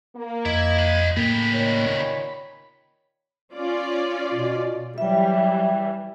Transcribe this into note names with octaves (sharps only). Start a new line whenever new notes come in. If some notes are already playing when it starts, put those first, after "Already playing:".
A#3
F2 E4 D#5 G#6
C5 B5
A2 C#3 A#3 G4 B5
A#2 D#3 C#5
B5
C#4 F4 D5
B2
E3 F#3 G3 E5 G5